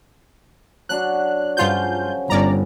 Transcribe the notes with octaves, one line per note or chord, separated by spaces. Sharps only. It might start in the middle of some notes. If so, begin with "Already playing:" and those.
F#3 D4 F#4 F#6
G2 C#3 F3 F#3 F4 G6
G1 C#4 D5 A#5